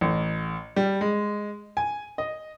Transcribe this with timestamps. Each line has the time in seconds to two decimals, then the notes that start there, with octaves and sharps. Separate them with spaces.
0.01 A1
0.76 G3
1.01 G#3
1.77 G#5
2.18 D#5